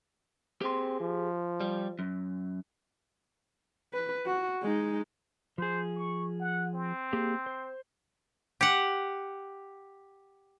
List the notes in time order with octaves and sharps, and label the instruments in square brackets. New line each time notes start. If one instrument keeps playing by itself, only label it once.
[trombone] C4 [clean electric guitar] G4 G#4 C6
[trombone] F3
[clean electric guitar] G3
F#2
[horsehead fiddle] B4
F#4
G#3 D#4
[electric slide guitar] F3 G#4 [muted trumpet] C5
[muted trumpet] C#6
F#5
C4
[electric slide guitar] A#3 G4 G#4
C5
[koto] G4 F#5